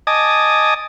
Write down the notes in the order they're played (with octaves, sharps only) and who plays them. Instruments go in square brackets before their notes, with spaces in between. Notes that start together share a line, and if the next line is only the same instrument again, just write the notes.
[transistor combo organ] D#5 G#5 A5 D6 D#6